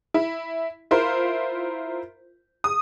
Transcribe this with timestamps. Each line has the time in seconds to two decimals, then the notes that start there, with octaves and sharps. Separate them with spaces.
0.14 E4
0.91 E4 F4 A#4 C5
2.64 D#6